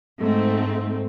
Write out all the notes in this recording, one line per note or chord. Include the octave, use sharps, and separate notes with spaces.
G#2 A3 C4